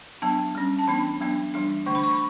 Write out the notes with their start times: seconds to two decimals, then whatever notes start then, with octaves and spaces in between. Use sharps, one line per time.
0.22 F#3 B3 D4 A5
0.55 G3 C#4
0.78 A5
0.87 E3 B3 D4 B5
1.21 F#3 B3 D4
1.54 E3 G3 D4
1.86 D3 A3 D4 C#6
1.95 B5
2.04 C#6
2.11 B5